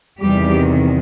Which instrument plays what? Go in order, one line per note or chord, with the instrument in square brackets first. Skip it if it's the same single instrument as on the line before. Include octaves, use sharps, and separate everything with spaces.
[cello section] E2 C3 D#3 G3 G4